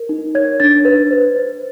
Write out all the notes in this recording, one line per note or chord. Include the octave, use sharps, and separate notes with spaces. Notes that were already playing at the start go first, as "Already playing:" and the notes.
Already playing: A#4
D#4
C#5 G#6
D4 A6
B4
C5
C5